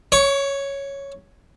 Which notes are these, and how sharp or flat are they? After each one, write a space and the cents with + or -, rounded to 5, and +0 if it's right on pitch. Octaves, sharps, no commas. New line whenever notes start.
C#5 +0 C#6 +40